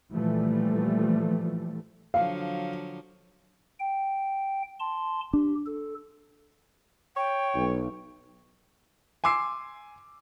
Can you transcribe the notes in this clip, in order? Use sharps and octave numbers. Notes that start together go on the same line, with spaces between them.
A#2 E3 F3 G3 A3
D3 F3 F#3 F5
G5
A5 C6
D4 G4
A4
C#5 G5
B1
G#5 C6 D6 E6 C7